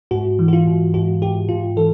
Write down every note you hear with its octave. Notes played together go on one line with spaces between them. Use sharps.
G#2 F#4
E3
F#4
F4
G#2
G#2 F#4
G#2 G4
G#2 F4
E3 A4